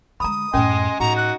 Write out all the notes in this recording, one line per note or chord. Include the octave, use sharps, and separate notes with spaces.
D3 G#3 A#5 B5 D#6
F#2 A2 C#4 D#5 G#5 C6
A2 D#4 F#4 A#5
F#6